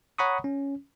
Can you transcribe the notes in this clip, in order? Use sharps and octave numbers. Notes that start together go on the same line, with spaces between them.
C#5 F#5 A#5 B5 C#6 D#6
C#4